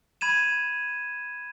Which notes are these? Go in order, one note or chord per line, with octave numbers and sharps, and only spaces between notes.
B5 G#6 D#7 E7